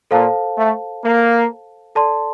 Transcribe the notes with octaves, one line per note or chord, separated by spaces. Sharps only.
A#2 A4 C5 F5 A5
A3
A#3
A4 D5 A5 C6